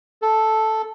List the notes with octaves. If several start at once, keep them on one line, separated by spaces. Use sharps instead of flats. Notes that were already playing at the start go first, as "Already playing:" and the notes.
A4